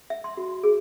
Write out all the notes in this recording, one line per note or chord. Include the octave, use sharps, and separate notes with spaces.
E5
C6
F#4
G#4